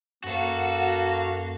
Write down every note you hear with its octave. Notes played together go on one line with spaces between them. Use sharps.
F#2 A#3 F#4 A4 F5